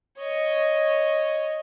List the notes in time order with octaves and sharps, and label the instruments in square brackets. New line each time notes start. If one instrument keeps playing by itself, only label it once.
[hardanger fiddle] C#5 D#5